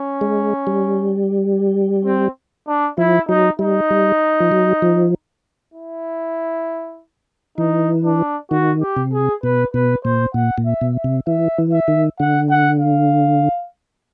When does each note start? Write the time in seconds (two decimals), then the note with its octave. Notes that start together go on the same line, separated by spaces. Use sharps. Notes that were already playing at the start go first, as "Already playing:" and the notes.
Already playing: C#4
0.21 G#3
0.67 G3
2.05 C4
2.68 D4
2.98 F3 E4
3.28 F#3 D#4
3.59 G3 D#4
3.90 G3
4.40 F3
4.52 F#3
4.82 F3
5.74 E4
7.58 E3 D#4
8.04 D4
8.51 D#3 F#4
8.81 G4
8.97 C3
9.12 G#4
9.43 B2 B4
9.74 B2 B4
10.04 A#2 C5
10.34 A#2 F#5
10.58 A#2
10.66 E5
10.81 B2
10.96 E5
11.04 C3
11.27 E3 E5
11.58 E3
11.73 E5
11.88 D#3
12.20 D3 F#5
12.50 F#5
12.80 F5